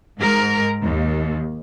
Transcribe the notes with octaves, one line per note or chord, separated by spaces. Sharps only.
G#2 A#4
D#2